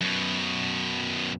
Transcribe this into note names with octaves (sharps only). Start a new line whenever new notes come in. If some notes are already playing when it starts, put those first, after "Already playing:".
F#2 B2